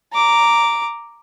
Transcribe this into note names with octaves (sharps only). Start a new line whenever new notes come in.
A#5 D6